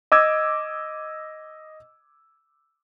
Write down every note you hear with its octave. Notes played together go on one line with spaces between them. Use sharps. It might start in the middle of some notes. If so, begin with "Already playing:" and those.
D#5 D6 E6 G#6